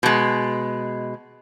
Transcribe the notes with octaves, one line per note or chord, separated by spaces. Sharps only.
B2 G#3